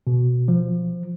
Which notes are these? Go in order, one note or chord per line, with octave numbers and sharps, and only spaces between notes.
B2
F3